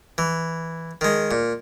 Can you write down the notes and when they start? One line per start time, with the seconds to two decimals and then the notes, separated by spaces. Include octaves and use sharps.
0.18 E3
1.01 D#3 G#3
1.31 A#2